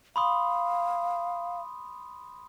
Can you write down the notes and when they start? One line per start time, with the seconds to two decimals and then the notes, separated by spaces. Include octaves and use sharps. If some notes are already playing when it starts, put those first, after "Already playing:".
0.16 F5 B5 C6 D#6